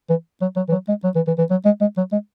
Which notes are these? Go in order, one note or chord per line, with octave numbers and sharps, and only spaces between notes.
E3
F#3
F#3
E3
F#3
G#3
F#3
E3
E3
E3
F#3
G#3
G#3
F#3
G#3